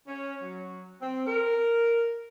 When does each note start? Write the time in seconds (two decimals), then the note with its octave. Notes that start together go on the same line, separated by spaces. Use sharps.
0.07 C#4
0.42 F#3
1.01 C4
1.27 A#4